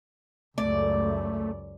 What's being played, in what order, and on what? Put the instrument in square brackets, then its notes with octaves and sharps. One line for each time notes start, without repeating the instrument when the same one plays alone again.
[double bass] C#2 F#2 [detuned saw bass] A3 [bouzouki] D5